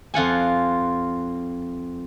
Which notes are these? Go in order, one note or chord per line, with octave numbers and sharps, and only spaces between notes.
F2 F4 F#5 G#5